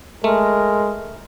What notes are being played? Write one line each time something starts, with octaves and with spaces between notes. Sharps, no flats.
G#3 A3 A#4